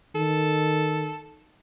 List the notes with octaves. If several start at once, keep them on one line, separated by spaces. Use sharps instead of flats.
D#3 A4